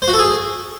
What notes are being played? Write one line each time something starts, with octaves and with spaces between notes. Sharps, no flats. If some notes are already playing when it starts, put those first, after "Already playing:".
C5
F#4
A4
G#4